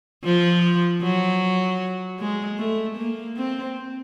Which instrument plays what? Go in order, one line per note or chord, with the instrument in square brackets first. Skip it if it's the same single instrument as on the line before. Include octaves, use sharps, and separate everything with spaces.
[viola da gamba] F3
F#3
G#3
A3
A#3
C4